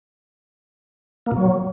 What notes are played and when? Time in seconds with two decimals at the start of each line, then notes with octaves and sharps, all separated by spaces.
1.26 A#3
1.32 B2
1.37 F#3